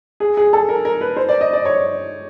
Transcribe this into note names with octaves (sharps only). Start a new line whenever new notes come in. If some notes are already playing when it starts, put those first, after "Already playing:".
G#4
G#4
A4
A#4
A#4
B4
C5
D5
D#5
D5
C#5